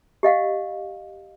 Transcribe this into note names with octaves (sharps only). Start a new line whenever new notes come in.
G4 D#5 F5 F#5